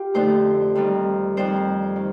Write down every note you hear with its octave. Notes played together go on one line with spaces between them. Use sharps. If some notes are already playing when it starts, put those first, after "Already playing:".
Already playing: F4 G4
F2 D3 A3 D#4 C5
F2 D#3 G3 C4
F2 D#3 G3 C4 C5
D#3